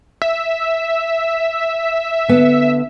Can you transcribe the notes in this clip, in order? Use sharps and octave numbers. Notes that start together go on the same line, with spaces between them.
E5
D3 B3